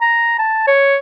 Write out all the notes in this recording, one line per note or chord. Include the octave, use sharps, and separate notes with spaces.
A#5
A5
C#5